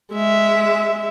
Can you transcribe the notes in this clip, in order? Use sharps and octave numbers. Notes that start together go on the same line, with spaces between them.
G#3 E5